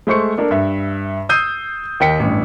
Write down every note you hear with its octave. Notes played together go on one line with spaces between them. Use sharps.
G#3 A3 C5 C#6 C#7
A#3 D4 A4 A#4
G2 E5
D#6 E6 G6 C7 D#7
D#2 A#3 D#5 G5 B6 C#7
A1 G2